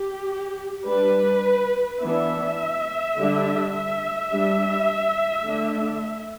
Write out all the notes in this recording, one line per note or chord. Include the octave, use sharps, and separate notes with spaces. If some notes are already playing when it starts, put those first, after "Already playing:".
Already playing: G4
G3 D4 B4
E3 B3 D4 E5
D3 G3 D4
E5
G3 D4
D3 A3 D4